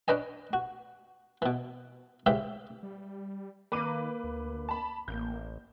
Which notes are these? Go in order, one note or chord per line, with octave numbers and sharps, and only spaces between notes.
C#4 D4 B4 D#5 G#5
F#4
B2 E3
G#2 C#3 E3 G4 E5
G3
D#3 A#3 B4 D6 D#7
D2
A5 B5
A1 A#3 G6